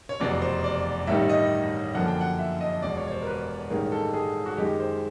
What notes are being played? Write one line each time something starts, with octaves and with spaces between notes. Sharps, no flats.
C#5
F1 E2 B2 F#3 B3 D5
C5
D5
A1 G2 D#3 G3 E5
D#5
F#2 D3 F3 A#3 F#5
G5
F#5
E5
D#5
E1 E2 B2 D5
C#5
C#5
C5
A#4
B4
A1 G2 D#3 G#3 A#4
A4
G#4
F#4
F#2 D#3 G#3 G4
C5